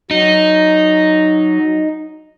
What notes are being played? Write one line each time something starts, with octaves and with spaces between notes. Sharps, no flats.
F#3 D#4